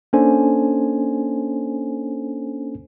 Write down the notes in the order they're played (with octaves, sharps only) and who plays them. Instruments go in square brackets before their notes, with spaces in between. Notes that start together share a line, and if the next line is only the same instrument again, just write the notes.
[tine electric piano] A#3 C#4 D4 A4 C5 G#5